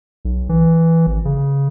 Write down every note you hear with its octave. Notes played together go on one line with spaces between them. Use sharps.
B1
E3
G#1
C#3